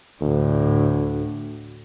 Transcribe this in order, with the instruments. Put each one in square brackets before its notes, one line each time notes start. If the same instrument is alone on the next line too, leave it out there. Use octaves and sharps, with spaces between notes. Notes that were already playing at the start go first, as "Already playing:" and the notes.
[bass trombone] D2 [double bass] A2 D3